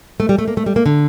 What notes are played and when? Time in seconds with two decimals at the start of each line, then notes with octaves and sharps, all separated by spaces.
0.20 A3
0.29 G3
0.38 A3
0.48 A#3
0.57 A3
0.66 G3
0.76 A#3
0.86 D3